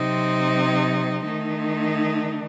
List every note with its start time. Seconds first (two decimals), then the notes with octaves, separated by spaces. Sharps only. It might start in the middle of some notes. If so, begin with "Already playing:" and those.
Already playing: C3 F#3 C4 D#4
1.24 D#3 A3 D#4